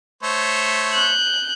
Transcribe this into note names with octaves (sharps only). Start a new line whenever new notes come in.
A3 C5 C#5
F#6 G6